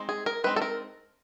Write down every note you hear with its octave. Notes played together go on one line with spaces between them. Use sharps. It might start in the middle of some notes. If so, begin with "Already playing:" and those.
Already playing: G#3 C4 D#4
G#4
A#4
G#3 C4 D#4 B4
A4
A#4